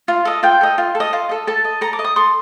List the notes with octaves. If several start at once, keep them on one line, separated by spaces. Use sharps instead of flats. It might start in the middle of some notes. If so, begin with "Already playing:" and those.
F4
A4 D#5
F4 G5
A4 D#5
F4
A4
D#5
F4
A4 D#5
A4 A5
D#5
A4 A#5
D6
D#5
D#6
A4 C6